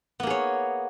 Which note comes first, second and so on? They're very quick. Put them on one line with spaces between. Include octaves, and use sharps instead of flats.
B3 A#3 G#4 C#5